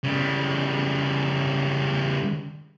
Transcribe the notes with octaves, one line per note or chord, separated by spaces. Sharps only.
C#3 G3